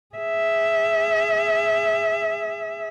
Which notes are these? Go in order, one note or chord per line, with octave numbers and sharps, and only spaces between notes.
G#4 E5